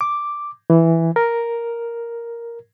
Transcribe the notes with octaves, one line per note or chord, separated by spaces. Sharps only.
D6
E3
A#4